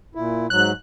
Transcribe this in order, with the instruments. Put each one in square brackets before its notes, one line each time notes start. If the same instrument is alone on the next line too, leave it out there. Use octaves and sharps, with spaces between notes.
[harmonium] A#2 E4
[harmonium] G#2 F#3 [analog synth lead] F#6